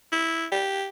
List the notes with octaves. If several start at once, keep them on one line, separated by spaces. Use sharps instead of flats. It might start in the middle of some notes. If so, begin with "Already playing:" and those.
E4
G4